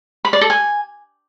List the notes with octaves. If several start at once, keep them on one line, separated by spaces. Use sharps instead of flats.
B5
D5
A4
G#5